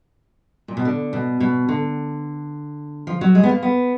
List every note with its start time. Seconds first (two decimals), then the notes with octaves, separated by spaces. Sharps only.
0.68 A#2
0.77 B2
0.85 D3
1.13 B2
1.40 B2
1.69 D3
3.07 F3
3.21 F#3
3.35 G#3
3.43 B3
3.49 A#3
3.63 B3